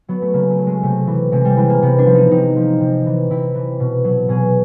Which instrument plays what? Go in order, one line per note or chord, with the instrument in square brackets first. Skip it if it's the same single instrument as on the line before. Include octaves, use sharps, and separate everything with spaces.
[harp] F#3 B3
A3
C#3 A#3
A3
F#3
G#3
C3 A3
E3
C3 G#3
G3
E3 G#3
A#3
C3 B3
D4
F3
D#4
C3 D#4
F3
C3
E3
C3 E4
E3
B2
F#3
B2 G#4